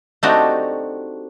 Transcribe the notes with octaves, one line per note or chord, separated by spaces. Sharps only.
A3 C4 D4 D#4 F#4 G4